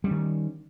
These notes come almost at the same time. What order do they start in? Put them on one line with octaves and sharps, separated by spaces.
G3 C#4 D#3